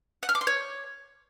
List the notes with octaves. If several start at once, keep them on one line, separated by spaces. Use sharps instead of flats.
F#5
F6
D6
C6
C#5